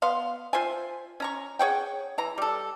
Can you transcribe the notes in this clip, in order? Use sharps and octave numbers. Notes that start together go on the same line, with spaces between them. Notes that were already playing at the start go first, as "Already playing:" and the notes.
B3 F5 C6
F4 C5 E5 G#5
C#4 A#5 C#6
G#4 C#5 F#5 G5
E3 A#5
G3 A4